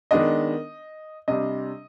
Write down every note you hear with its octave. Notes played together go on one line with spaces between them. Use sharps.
D#3 G#3 B3 D4 D#5
C3 G3 D4 D#5